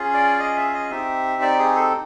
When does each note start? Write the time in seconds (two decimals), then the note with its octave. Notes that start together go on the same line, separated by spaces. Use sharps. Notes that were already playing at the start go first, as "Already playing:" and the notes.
Already playing: C#4 F4 G#4
0.14 D5
0.39 D#5
0.56 E5
0.74 D#5
0.90 C4 D#4 G4 E5
1.42 D5
1.59 G#4
1.75 A4